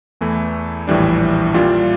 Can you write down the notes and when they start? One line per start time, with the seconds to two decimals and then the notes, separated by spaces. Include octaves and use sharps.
0.21 E2 E3 A3 E4
0.87 A#1 A2 E3 G3 D4
1.54 A#2 G3 D4 F4